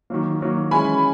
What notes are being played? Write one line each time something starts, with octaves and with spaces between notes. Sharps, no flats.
D#3 F#3 A#3
D#3 F#3 A#3
E3 G#3 C#4 G#5 B5